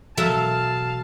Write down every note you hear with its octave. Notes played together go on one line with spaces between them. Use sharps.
B2 E3 F#3 A4 E5 F5 A5